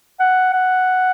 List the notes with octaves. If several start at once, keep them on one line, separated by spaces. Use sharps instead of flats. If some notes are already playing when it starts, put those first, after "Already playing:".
F#5
F#5